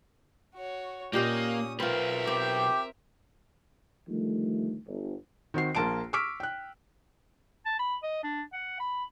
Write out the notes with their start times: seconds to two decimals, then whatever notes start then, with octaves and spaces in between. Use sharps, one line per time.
0.55 F#4 C#5
1.13 A#2 A#3 C#4 G4 D#5 D#6
1.80 B1 C4 F4 A#4 B4 E5
2.27 C4 G4
4.09 D2 D#3 F3 G3 A3
4.87 G1
5.54 D#3 C4 F#4 C7
5.75 A#1 A#3 A5 C6 D7
6.13 C#6 D6 E6 F6 B6 D7
6.40 G5 F#6
7.66 A5
7.79 B5
8.03 D#5
8.23 D4
8.53 F#5
8.80 B5